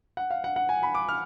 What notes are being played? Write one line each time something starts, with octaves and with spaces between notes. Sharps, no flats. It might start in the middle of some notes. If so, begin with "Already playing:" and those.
F#5
F5
F#5
F#5
G#5
B5
D6
F6